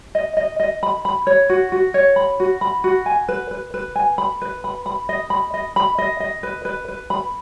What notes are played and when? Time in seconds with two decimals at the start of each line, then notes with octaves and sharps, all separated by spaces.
0.15 D#5
0.37 D#5
0.60 D#5
0.83 B5
1.05 B5
1.27 C#5
1.50 F#4
1.72 F#4
1.94 C#5
2.16 B5
2.40 F#4
2.61 B5
2.84 F#4
3.06 G#5
3.28 B4
3.51 B4
3.74 B4
3.96 G#5
4.18 B5
4.42 B4
4.64 B5
4.86 B5
5.09 D#5
5.30 B5
5.54 D#5
5.76 B5
5.98 D#5
6.20 D#5
6.43 B4
6.65 B4
6.88 B4
7.10 B5